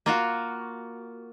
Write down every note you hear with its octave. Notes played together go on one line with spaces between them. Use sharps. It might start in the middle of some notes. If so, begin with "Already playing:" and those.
A#3 F4 F#4